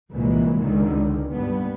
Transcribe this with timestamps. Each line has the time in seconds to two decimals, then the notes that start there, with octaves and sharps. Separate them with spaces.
0.12 C2 F#2 A#2 E3 G#3
0.60 C#2 D3 D#3
1.31 G2 B3